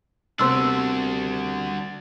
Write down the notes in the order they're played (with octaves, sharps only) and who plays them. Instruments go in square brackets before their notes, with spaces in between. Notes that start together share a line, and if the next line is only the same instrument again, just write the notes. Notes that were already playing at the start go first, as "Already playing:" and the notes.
[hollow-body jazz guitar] C2 C3 B3 [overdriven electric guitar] D4 F#4 [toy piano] C5 C6 E6